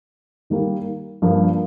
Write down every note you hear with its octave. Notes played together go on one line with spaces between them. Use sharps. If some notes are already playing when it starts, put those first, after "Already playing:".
D#3 G3 A#3
G2 F3 A#3